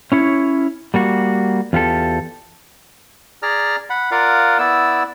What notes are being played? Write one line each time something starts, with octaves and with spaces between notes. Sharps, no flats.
C#4 E4 C#5
G3 A#3 F#4
E2 F4 G4 A4
G#4 D5 A#5 F6
F#5 B5
F4 A#4 D5 F5 F#5
B3 E4 D5 E6